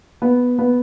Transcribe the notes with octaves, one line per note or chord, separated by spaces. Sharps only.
B3
B3